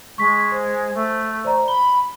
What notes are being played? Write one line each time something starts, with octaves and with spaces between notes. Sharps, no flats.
G#3 C#6 B6
C5
A3
C5 D5 A#5
B5 G7